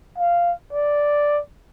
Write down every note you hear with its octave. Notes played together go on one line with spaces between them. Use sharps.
F5
D5